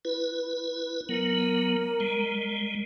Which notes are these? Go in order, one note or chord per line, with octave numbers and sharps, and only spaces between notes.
E4 B4
F#3 B3 A#4
G3 G#3